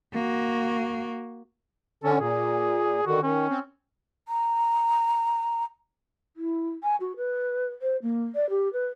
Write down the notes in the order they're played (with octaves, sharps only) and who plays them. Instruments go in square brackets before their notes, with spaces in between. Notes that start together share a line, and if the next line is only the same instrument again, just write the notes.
[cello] A#3 F#4
[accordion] D3 C#4 [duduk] A4
[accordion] A#2 [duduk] G#4
[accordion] D3 D#3 [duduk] F#4
[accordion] D#3 [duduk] C#4
[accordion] C4
[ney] A#5
E4
G#5
F#4
B4
C5
A#3
D5
G4
B4